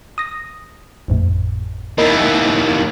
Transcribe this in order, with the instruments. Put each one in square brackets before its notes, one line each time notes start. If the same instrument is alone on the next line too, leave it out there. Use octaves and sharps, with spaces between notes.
[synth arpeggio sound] D#6 A#6
G#1 F2 A2
[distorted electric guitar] D#2 E3 [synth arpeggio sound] A#4 D#5 B5